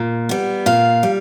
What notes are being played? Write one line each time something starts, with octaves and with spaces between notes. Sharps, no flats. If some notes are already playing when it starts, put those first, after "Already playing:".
Already playing: A#2
G3 B3
A#2 F5
G3